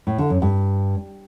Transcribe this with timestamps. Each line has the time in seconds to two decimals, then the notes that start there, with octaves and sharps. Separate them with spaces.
0.07 A2
0.18 D3
0.30 F#2
0.42 G2